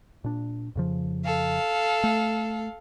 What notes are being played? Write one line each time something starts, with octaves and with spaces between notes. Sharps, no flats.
A#2 D4
F2 C#3 F3
A4 F5
A3